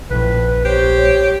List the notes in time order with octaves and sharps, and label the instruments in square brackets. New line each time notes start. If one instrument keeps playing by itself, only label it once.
[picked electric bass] A#1 F3 [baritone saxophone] A2 [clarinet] B4
[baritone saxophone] G4 [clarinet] C5 [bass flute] C#5